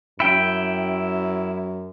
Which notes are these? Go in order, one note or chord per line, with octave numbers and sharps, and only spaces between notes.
F#2 E4 G5